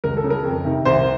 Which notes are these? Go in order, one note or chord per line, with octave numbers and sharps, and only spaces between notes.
C#2 A#4
A4
C#3
A#4
F2
C3 D#3
C2 C5